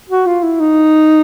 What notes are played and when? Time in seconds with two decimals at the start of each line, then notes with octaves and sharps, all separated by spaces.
0.10 F#4
0.26 F4
0.43 E4
0.60 D#4